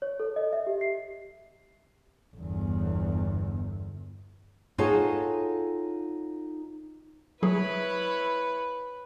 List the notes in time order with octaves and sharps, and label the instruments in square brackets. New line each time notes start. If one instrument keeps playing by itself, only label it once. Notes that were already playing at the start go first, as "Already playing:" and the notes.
[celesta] C#5
A4
D#5
E5
G4
C7
[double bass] G1 E2
[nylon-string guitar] D#4 F4 F#4 G#4 A4 C#5
[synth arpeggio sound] F#3 G#4 [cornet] E4 [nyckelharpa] B4 [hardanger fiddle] C#5 B5